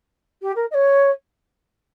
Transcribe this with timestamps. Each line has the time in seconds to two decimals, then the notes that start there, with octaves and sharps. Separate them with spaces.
0.42 G4
0.56 A#4
0.71 D#5
0.74 C#5